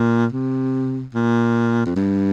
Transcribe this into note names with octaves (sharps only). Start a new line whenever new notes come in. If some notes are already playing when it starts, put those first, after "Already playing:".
Already playing: A#2
C3
A#2
F2
G2